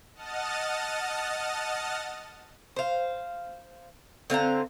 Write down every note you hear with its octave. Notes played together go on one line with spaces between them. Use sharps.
D#5 F#5 A5 D#6 F6 A6
C5 F5
D3 C4 F5 A#5